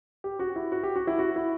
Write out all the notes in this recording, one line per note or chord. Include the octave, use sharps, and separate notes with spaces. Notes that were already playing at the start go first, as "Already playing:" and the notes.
G4
F#4
E4
F#4
G4
F#4
E4
F#4
E4